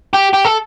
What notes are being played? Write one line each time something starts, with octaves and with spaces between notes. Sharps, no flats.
G4
G4
A4